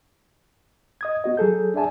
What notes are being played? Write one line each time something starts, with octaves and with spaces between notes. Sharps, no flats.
D#5 D#6 G#6
B3 F#4 D#5
F#3 G#4 A4 G6
D4 G#4 D5 E5 G#5 A5